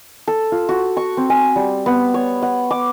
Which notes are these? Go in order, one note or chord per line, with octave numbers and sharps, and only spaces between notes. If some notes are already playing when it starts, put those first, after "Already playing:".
A4
F4
F#4
C#6
C4
G#5
G3
B3
C#5
F#5
D6